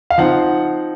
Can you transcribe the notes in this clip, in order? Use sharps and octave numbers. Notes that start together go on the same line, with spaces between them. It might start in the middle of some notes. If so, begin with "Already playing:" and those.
F5
F3 C4 D#4 F#5